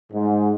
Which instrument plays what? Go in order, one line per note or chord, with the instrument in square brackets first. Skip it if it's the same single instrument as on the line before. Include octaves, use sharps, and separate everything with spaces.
[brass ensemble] G#2